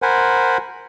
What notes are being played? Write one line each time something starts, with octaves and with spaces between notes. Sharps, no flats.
A#4 C5 F#5 G#5 B5